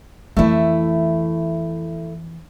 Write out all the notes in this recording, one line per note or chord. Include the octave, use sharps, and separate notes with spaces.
F2 E3 A3 E4